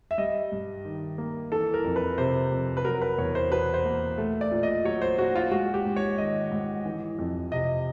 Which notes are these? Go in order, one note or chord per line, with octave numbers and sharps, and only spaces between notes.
E5
G3 D#5
G2
D#3
A#3
E3 A4
A#4
F2
B4
C3 C5
F2
B4
F#3 A#4
B4
E2 C#5
C5
B2 B4
C5
A#3
A3
D5
A#2
D#5
F#3 C#5
C5
A#2 F#4
F4
G#3 F#4
G4
G#2
C#5
D#3 D#5
G#2
E3
F2
C3 D#5